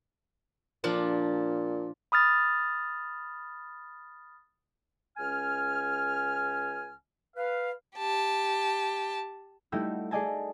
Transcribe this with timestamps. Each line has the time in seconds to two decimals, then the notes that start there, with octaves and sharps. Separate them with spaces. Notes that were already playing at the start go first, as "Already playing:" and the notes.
0.84 A#2 F3 D4 F4
2.12 B5 D#6 F6 A6
5.17 C#2 C#4 G#5 F6
7.37 B4 F5
7.96 G4 A5
9.72 G3 A3 D#4 E4 F#4 G4
10.11 G#4 A4 D5 D#5 G#5 A5